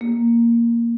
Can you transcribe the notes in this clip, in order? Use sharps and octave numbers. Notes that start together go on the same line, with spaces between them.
A#3